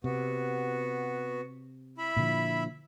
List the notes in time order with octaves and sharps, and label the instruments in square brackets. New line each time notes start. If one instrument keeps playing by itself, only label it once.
[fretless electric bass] C3 [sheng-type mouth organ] B3 F#4
[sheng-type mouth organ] E4 E5 B5
[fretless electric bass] A#2 D3 F3